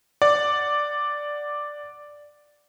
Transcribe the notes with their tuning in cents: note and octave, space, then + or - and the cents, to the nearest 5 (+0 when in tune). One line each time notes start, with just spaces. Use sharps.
D5 +0 F#5 +0